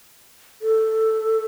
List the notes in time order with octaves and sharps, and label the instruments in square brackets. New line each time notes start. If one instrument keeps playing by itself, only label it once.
[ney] A4